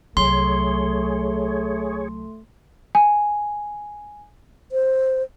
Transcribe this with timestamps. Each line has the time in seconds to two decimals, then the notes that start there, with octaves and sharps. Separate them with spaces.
0.17 C2 F#3 A3 G#4 C#5 C6
2.95 G#5
4.72 C5